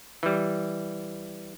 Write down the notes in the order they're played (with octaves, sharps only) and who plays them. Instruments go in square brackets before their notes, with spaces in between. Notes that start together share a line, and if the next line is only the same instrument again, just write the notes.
[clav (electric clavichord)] E3 G3